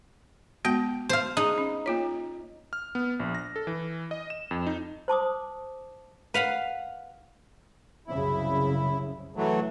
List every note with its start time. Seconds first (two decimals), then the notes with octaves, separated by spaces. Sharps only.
0.65 G#3 B3 F#4 G5
1.09 C5 F5
1.37 D#4 G#4
1.58 C#4
1.86 A#3 F4 C#5
2.73 F6
2.95 B3
3.20 A#1
3.35 A#6
3.56 A4
3.67 E3
4.11 D#5
4.30 E7
4.51 F2
4.67 D#4
5.08 C5 A5 D6 D#6
6.34 B4 F5 F#5 B5
8.08 C2 F#2 C#3 E4
9.36 E3 F#3 A3